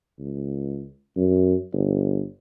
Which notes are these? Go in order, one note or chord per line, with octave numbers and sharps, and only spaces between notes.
C#2
F#2
G1